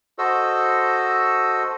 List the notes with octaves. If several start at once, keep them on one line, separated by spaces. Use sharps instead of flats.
F#4 A4 C5 D#5 E6